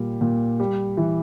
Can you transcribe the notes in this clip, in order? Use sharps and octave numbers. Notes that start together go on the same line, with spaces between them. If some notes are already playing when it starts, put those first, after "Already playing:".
Already playing: A#2 G3
A#2
G3
E3